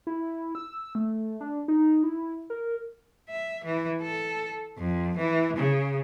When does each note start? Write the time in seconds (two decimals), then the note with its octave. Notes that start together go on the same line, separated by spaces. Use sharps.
0.07 E4
0.55 E6
0.95 A3
1.41 D4
1.68 D#4
2.03 E4
2.50 A#4
3.30 E5
3.64 E3
4.02 A4
4.78 F2
5.17 E3
5.57 C#3